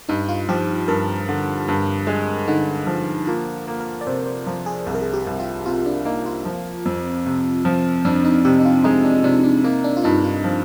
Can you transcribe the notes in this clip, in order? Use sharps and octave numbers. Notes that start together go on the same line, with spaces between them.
G2 D#4
F4
F3 G4
G2 A#4
D3
G2
G#3
D3 D#4
F3
A#3 F4
A#3
A#4
D5
C3 C5
C5
F3 A#4
G#4
C2 G#4
A#4
G#4
G4
C2
F4
C3 F4
D4
A#3 D#4
F4
F3
F2
C3
F3
F2 D4
D#4
C3 G4
D#4
F4
G#3 D#4
D4
C3 D4
D4
A#3 D#4
D4
F4
G2 D#4
F4
F3